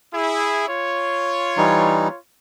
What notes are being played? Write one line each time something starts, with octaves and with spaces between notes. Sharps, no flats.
E4 G#4
F4 C#5
E3 G3 D#4